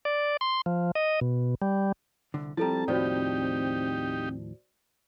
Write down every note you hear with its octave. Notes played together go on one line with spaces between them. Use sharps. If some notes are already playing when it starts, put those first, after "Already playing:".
D5
C6
F3
D#5
B2
G3
C2 D3
F3 G3 C4 E4 A4 A5 A#5
D#2 A2 F3 D#4 F#4 G4 C5 D5